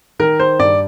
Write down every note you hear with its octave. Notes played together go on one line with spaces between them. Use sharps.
D#3 A#4
C5
G2 D5